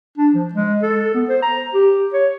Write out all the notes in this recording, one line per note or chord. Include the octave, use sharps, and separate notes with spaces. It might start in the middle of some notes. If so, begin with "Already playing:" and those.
D4
F3
G#3
A4
B3
C5
A#5
G4
C#5